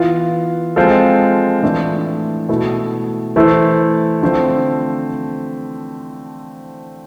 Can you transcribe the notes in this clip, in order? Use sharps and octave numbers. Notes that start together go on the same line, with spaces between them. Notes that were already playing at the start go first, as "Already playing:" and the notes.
Already playing: E3 B3 F4
F3 G#3 C4 F4 A4
A2 E3 A3 D4
B2 A3 E4 A4
E3 A3 E4 A4 C5
D3 F3 A3 C4